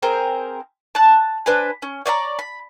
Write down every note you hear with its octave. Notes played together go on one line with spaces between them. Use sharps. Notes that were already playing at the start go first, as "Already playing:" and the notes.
C4 G#4 A#4 C5
A5 F#6
D4 B4 C5 G#5
C#4
C#5 D5 E5 A#5
B5